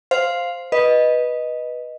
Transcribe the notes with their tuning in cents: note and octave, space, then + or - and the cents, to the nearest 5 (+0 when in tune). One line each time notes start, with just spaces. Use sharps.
C5 +0 F5 +0
B4 -10 D#5 +0